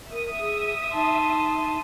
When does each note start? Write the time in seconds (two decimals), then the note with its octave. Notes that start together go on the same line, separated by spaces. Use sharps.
0.11 A#4 E5 D#6
0.40 G#4
0.94 D#4 A5 C6